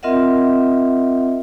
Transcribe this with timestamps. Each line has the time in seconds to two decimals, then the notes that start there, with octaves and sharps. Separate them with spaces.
0.03 C4 F4 A#4 D#5 E5 F#5